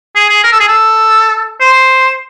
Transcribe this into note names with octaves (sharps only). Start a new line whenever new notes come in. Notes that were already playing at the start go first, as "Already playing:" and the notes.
G#4
G#4
A#4
A4
G#4
A4
C5